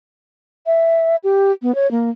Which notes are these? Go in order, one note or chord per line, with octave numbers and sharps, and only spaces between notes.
E5
G4
B3
C#5
A#3